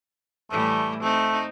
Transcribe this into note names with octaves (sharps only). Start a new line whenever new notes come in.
A2 E3 G3 A3
A3 C4 D#4